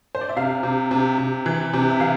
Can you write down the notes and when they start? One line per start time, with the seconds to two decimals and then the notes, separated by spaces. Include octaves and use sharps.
0.15 C5
0.21 D5
0.29 E5
0.37 C3 F5
0.63 C3
0.91 C3
1.18 C3
1.46 E3
1.74 C3
1.90 E5
2.00 E3 F5